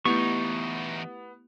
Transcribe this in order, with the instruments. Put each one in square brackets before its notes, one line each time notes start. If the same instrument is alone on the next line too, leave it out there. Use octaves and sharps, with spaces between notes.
[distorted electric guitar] E2 D#4 [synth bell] A3 E4 G4 [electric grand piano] B3 [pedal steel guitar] C#6